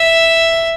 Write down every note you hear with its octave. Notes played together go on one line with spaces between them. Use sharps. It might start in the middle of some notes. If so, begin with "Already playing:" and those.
Already playing: E5